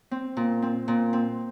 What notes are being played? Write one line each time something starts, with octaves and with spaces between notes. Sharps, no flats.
C4
A#2
C4
A#2
C4